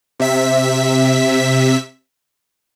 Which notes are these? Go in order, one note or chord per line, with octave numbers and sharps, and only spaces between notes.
C3 E5 B6